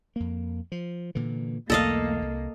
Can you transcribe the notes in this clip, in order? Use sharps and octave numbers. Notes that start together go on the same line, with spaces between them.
F2 A#3
F3
A#2 D3 E3
B1 E2 A3 A#3 A4 D#5 F5
C2